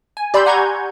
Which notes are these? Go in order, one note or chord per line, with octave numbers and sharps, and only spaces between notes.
G#5
G4 D5 B5 C6 E6 G6
F#5 G#5 A#5 C#6 G6 G#6